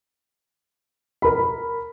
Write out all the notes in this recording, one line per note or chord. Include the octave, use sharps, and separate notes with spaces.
A#4 B5